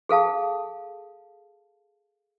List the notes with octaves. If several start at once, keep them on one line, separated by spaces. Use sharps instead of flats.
G#4 A4 F5 A5